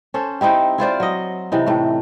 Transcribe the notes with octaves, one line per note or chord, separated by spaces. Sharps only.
C#4 A4 C5
C4 D#4 E4 G4
E4 F4 C5 D5
F#3 D#5
C3 E3 D#4
A2 A3